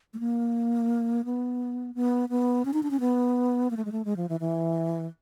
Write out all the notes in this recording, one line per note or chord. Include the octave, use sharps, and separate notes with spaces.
A3
A#3
B3
B3
B3
C#4
D#4
D4
C#4
B3
A#3
A3
G#3
A3
G#3
F3
E3
E3